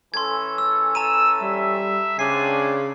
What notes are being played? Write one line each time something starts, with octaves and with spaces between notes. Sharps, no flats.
E3 C#4 A4 C6 G#6
E6
A5 A#5 E6 D#7
G3 E5
C#3 G#3 C4 D4 G#5 C7